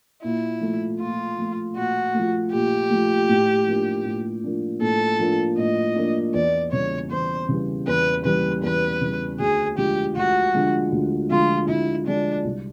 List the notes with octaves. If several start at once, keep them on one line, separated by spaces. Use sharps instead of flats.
A#2 E4
F3 A3
A#2 F4
F3 A3
A#2 F#4
A3
F3
A#2 G4
F3 A3
A2
F3 A#3 D4
A2
F3 A#3 D4
A2 A4
F3 A#3 D4
A2 D#5
F3 A#3 D4
E2 D5
C#3 E3 G3 C#5
E2 C5
C#3 E3 G3
E2 B4
C#3 E3 G3 B4
E2 B4
C#3 E3 G3
D2 G#4
D3 F3 G#3 G4
D2 F#4
D3 F3 G#3
D2
D3 F3 G#3 F4
D2 E4
D3 F3 G#3 D4
C2